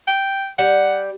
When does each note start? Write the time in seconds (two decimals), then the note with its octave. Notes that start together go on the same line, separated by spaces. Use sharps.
0.08 G5
0.59 G3 F#5